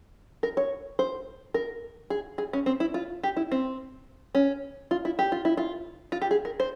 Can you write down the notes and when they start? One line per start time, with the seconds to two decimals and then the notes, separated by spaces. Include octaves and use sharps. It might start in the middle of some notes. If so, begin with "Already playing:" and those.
0.43 A#4
0.57 C#5
0.99 C5
1.54 A#4
2.10 G#4
2.38 G#4
2.53 C#4
2.66 C4
2.80 E4
2.94 F4
3.24 G4
3.37 E4
3.52 C4
4.35 C#4
4.91 F4
5.05 E4
5.19 G4
5.32 F4
5.45 E4
5.57 F4
6.12 F4
6.22 G4
6.31 G#4
6.45 A#4
6.60 C5